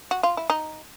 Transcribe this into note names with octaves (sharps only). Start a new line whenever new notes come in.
F#4
F4
E4
D#4